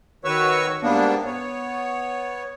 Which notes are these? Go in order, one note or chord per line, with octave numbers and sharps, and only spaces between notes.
D#3 F#4 B4 C#5 C#6 E6
G#2 G3 A#3 B3 D4
B3 C#5